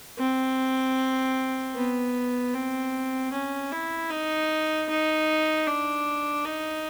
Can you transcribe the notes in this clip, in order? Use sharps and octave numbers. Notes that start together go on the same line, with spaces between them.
C4
B3
C4
C#4
E4
D#4
D#4
D4
D#4